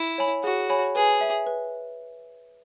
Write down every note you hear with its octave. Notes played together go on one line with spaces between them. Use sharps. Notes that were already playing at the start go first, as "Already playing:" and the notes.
Already playing: E4
C#5 G#5 B5
F#4 G#4
C#5 G#5 B5
G#4 B4
E5 G#5
B4